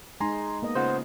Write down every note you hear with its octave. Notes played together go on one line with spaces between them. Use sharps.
G#3 D#4 G#5 A#5 C6
A#3 B3 D#5
C#3 F4 C5 F#5